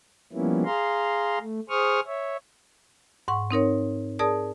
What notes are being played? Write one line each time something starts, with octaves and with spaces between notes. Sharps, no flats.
F3 G3 A#3 B3 C#4 E4
G#4 F5 A#5 C6
A3
G#4 C5 C#6 D#6 F6
C#5 E5
G#2 F#5 C#6
C4 D#4 A#4 C#5
G#4 A#4 D5 A5 D#6